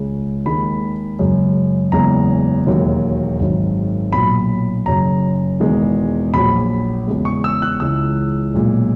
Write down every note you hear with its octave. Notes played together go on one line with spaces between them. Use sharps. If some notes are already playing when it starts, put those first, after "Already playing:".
Already playing: C#2 C#3 G#3
D#2 D#3 G#3 B5
F#1 F#2 C#3 G#3
F#1 E2 C#3 G#3 A#5
E1 D#2 D#3 F#3
G#1 F#2 D#3 F#3
B1 A#2 F#3 B5
F#1 F#2 C#3 A#5
E1 E2 D#3 G#3
A#1 A#2 F#3 B5
E2 C#3 G#3
C#6
E6
F#6
C#2 C#3 E3 G#3 E6
B1 A#2 G#3